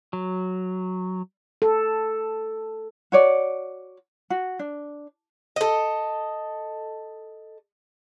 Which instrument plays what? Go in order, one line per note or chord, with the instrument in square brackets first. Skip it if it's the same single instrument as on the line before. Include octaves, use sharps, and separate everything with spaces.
[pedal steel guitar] F#3
[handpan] A4
[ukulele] F#4 C#5 D5
F#4
D4
[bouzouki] A4 D#5